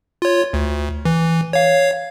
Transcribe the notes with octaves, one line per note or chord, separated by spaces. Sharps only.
F4 C#5
D2
E3
C#5 F5